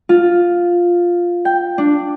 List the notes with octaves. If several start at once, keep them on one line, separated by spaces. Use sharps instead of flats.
F4
G5
D4